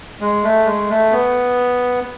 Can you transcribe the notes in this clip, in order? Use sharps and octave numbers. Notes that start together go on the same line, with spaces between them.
G#3
A3
G#3
A3
B3